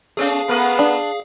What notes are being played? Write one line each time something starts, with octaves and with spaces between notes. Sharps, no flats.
A3 B3 C#4 G#4 F5
A3 B3 A#4 B4
D4